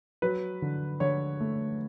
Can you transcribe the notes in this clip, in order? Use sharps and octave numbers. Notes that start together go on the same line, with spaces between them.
F#3 B4
D3
D3 C#5
A3